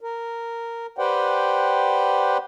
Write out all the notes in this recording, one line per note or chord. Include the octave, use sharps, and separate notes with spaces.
A#4
G4 B4 C5 D5 F#5 G5